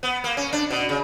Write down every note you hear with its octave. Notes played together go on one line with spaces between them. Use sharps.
B3
A#3
C#4
D4
B2
C#3